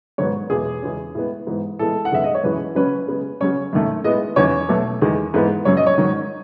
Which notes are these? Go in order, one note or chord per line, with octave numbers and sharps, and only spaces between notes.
G#2 D#3 F#3 B3 C#5
E2 B2 G#3 G#4
E2 C#3 G#3 C#4
A2 G#3 B3
G#2 E3 B3
A2 E3 G#3 B3 A4
F#5
F#2 D#3 G#3 B3 E5
D#5
C#5
F#2 E3 G#3 C#4 B4
C#3 F#3 C#4 B4
C#3 G#3 B3
C#3 F#3 C#4 C#5
F#2 D#3 A3
A2 G#3 B3 D#5
E2 D#3 F#3 C#4 C#5
B2 F#3 A3
E2 D#3 G#3
G#2 E3 G#3 B3
F#2 C#3 F#3 C#5
D#5
C#5
G#2 D#3 F#3